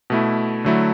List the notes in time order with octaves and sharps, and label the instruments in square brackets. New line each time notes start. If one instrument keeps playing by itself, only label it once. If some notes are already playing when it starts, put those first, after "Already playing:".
[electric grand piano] B2 A3 E4
D3 F#3 A3 E4